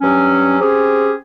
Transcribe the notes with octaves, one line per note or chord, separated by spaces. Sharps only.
G2 F#3 C#4
C4 C#4 G4 G#4